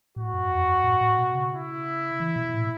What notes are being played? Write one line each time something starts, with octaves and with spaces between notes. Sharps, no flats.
A2 F#4
F#2
E2
F#2
A2
A2
B2
C#3
E4
E3
B2
A2